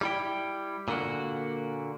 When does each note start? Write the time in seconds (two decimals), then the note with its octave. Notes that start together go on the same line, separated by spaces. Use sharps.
0.01 G3 E4 G5
0.88 A#2 D3 A#3 F#4